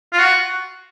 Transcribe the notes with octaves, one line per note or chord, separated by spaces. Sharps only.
F4
F#4